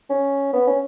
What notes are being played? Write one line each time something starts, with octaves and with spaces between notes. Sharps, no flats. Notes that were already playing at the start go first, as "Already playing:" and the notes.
C#4
B3
C#4